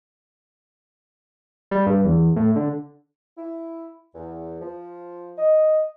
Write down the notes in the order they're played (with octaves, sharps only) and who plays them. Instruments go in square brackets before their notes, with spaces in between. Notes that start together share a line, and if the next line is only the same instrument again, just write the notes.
[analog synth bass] G3
G2
E2
A2
D3
[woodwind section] E4
E2
F3
D#5